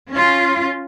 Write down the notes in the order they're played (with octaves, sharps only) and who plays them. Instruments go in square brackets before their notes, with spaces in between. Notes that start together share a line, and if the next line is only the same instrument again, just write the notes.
[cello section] C#4 F4